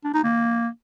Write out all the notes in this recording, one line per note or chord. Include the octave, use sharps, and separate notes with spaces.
D4
D#4
A#3